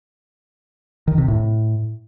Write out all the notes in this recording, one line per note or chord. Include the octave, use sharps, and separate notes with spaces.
D#3
C3
A2